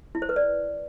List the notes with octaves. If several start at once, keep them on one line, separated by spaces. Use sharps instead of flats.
E4
C5
B4
D5